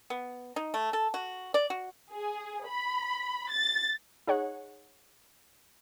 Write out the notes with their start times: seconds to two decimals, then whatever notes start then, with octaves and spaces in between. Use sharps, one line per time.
0.10 B3
0.56 D#4
0.74 A3
0.93 A4
1.14 F#4
1.54 D5
1.70 F#4
2.12 G#4
2.66 B5
3.50 A6
4.27 D#4 G#4 C#5 F#5